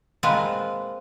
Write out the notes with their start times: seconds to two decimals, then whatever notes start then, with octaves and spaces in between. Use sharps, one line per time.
0.23 G#3 A#3 C4 F4 B4